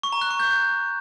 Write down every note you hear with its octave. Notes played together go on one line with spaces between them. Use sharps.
C#6
A#5
F#6
C#6
G6